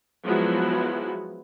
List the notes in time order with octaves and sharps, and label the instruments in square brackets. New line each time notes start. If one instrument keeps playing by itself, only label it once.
[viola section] F3 F#3 G#3 B3 E4 F#4